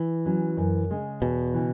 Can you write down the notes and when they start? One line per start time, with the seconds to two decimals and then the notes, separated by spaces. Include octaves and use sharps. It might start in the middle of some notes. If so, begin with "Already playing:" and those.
Already playing: E3
0.25 F#3 C#4
0.57 F#2
0.90 C#3 G#3
1.22 E2 B2
1.54 C#3 E3